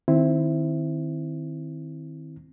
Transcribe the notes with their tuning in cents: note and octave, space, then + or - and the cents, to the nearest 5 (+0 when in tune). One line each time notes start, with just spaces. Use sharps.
D#3 -10 C4 +0 E4 +0